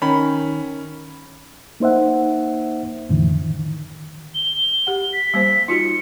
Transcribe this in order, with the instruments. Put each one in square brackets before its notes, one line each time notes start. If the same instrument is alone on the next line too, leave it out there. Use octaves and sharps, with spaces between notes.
[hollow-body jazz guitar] D#3 [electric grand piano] C#4 B5
[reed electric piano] A#3 D#4 C5 E5 F#5
F2 A2 D3 E3
D#3
[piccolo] G7
[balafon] G4 F#5
[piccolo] B6
[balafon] G3 A#3 C5
[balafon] D#4 F4 F#4 [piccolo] C#7